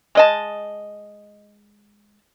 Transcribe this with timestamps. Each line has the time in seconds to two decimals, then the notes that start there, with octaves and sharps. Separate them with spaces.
0.15 G#3 D#5 A5